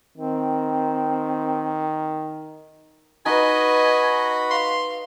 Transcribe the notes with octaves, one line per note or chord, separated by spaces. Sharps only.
D#3 C4
D#4 F#4 B4 D#5 G#5 B5
F5 C6